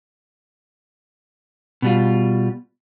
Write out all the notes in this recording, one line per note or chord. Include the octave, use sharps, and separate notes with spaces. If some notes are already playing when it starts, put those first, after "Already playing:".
B2 G3 F4